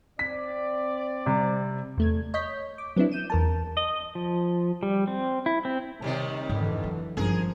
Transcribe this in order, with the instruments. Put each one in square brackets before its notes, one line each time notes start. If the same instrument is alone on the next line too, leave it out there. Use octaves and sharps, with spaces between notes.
[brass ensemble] C4 D5 [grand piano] B6
[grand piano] C3 G3
[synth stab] E2 A3 G#6
C#5 D#5 G6 B6
D6
F#3 B3 C4 D4 E4
G6 D#7 E7
E2 A#4 A5
[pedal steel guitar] D#5
F3
G3
C4
E4
C4
[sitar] D#2 D#3 G3 [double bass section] C3
[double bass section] F2 D3 E3 [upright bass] G#2
[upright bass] F#3
[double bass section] G#1 F3 [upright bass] G2 C#4 [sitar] G#4 A#4